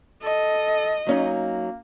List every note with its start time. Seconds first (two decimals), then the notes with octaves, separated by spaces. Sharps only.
0.23 A4 D#5
1.07 F#3 A#3 C#4 D#4